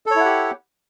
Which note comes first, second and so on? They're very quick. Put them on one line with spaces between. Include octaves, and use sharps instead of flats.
A4 C#5 E4 F#5 G4